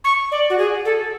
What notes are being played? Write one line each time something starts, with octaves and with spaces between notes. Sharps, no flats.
C#6
D5
F#4
G#4
A4